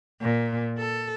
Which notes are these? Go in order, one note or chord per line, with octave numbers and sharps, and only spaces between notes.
A#2
A4